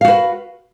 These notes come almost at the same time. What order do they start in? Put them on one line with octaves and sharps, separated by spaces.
F5 F#4 B4